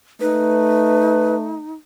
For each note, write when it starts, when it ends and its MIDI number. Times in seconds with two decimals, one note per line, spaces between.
0.21 1.61 57
0.21 1.71 63
0.21 1.35 71